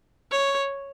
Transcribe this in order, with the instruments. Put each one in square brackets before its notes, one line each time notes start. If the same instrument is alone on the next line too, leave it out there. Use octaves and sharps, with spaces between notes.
[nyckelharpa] C#5